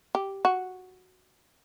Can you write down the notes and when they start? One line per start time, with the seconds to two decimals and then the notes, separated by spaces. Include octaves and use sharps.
0.15 G4
0.45 F#4